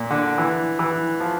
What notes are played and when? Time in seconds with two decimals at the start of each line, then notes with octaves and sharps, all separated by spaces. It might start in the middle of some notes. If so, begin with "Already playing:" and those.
Already playing: A#2
0.11 D3
0.38 E3
0.79 E3
1.20 F3